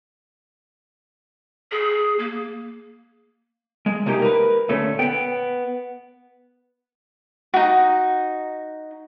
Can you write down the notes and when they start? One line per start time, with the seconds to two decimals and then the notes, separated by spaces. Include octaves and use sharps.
1.72 G#4
2.19 A#3
3.86 G#3
4.06 C3 G#3 A#3 D#4 G4
4.22 A#4 B4
4.69 D2 A#2 A3 C#4
4.99 B3 G5
7.54 D#4 F#4